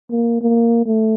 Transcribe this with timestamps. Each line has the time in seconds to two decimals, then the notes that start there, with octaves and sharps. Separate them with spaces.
0.11 A#3
0.41 A#3
0.86 A3